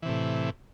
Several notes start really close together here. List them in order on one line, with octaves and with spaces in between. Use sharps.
E3 C3 A2